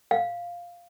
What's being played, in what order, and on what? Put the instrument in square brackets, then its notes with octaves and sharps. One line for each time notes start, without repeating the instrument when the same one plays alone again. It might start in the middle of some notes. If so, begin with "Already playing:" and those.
[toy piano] F5